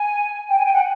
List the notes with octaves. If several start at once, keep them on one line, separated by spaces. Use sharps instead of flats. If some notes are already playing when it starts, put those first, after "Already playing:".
Already playing: G#5
G5
G#5
G5
F#5